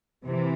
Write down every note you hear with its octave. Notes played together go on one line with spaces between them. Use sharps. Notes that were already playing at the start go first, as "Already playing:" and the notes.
C3 E3